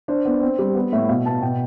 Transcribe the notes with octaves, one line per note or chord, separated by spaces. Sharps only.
D4 C5
B3
C4
G3
B3
A2 E5
B2 F5
B3 A5
B2 G5